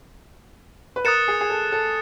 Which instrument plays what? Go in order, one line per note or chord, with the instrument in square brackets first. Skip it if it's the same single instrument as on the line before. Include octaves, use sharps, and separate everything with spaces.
[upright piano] B4
[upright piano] A#4 [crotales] D#6 F#6 A6 C#7 E7
[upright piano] G#4
G#4
A4
A4